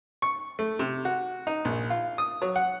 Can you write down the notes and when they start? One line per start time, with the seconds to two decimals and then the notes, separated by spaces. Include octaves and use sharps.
0.22 C#6
0.59 A3
0.79 C3
1.05 F#4
1.47 D#4
1.65 A#1
1.90 F4
2.18 D#6
2.42 F#3
2.56 F#5